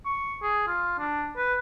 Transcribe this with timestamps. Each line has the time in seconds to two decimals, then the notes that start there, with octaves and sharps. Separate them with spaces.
0.06 C#6
0.42 G#4
0.68 F4
0.98 D4
1.37 B4